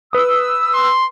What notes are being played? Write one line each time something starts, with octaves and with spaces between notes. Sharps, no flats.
B4 D#6 E6
C6